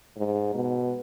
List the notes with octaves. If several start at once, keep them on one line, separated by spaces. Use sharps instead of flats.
G#2
B2